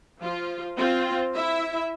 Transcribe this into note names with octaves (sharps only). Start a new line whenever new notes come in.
F3 F4
C4 F4
E4 E5